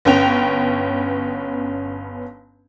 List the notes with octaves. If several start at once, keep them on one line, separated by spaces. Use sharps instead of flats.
G1 B3 C#4 G5 F7